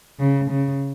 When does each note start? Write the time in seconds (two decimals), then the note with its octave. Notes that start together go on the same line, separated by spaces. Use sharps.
0.20 C#3
0.50 C#3